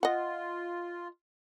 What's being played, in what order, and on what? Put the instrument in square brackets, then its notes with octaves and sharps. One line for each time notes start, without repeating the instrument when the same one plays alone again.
[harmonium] F4 [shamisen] D#5 F#5